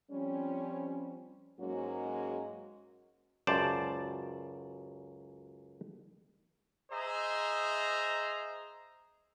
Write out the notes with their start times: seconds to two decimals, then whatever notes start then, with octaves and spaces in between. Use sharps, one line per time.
0.11 F3 G3 C4 C#4
1.60 G#2 F#3 G#3 A#3 C#4 F#4
3.47 C#2 F#2 C5 D5 A5
6.91 G#4 C5 D#5 E5 A#5